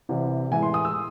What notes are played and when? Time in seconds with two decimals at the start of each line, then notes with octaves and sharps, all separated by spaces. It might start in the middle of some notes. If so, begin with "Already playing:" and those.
0.09 C2 C3 E3
0.51 A2 E3 G#3 G#5
0.63 C6
0.74 D#6
0.85 E6